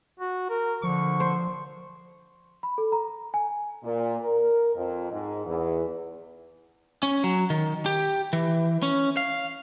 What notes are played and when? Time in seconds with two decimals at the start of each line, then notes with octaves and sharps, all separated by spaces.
0.20 F#4
0.50 A#4
0.83 D3 F3 C#6
1.20 C5
2.63 B5
2.78 A4
2.92 A#5
3.34 G#5
3.83 A#2
4.22 A#4
4.76 F2
5.11 G#2
5.45 E2
7.03 C#4
7.24 F#3
7.50 D#3
7.86 G4
8.33 E3
8.83 C#4
9.17 F5